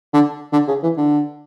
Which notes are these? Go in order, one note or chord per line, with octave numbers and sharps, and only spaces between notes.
D3
D3
C#3
E3
D3